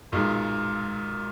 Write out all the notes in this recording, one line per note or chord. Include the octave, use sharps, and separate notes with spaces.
B1 A#2 G#3 D#4